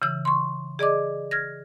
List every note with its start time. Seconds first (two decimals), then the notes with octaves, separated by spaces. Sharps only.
0.02 C#3 E3 E6
0.25 C6 C#6
0.79 G#4 D5 D#5 D6
1.31 F6 G#6 A#6